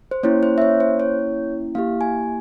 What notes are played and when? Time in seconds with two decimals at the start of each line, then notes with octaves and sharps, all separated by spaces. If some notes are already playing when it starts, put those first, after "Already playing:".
0.11 C5
0.23 A#3 C#4 E4 C#5
0.43 C5
0.58 E5
0.62 C#5
0.80 C5
1.00 C#5
1.75 A#3 E4 G4 F5
2.01 G#5